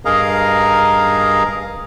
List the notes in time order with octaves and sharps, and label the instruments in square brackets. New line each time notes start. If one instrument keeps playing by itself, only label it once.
[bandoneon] G2 G#4 A#4 D#5 F5 A#5